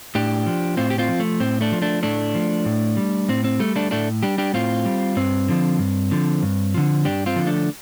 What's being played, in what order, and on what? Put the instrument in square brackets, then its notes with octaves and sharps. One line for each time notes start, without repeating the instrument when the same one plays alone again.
[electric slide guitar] A2 D4 G4
F3
A2 C4 F4
G4
C4 F4
F3
A3
A2 C4
A3 D4
F3
A3 D4
A2 A3 D4
F3
A2
G3
A2 C4
C4
G3 A3
A3 D4
A2 A3 D4
G3 D4 G4
D4 G4
A2 C4 F4
G3
G2 C4
D3 F3
G2
D3 F3
G2
D3 F3
G2 D4 G4
C4 F4
D3 F3
A3 D4